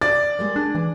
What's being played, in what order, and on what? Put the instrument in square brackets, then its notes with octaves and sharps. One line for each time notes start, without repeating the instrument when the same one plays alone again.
[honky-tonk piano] D5 [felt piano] A6
[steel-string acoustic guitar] G3 G#3 A#3
[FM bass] D4 [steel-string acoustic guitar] G#4
[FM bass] E3